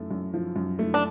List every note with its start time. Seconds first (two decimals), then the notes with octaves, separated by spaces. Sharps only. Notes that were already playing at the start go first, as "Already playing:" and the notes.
Already playing: F#2 A3
0.11 F#2
0.34 F3
0.56 F#2
0.79 A3
0.94 D4